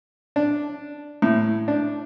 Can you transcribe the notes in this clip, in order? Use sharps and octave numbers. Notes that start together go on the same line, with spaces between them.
D4
A2
D4